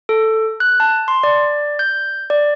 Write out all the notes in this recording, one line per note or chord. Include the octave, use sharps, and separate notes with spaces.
A4
F#6
A5
C6
D5
G6
D5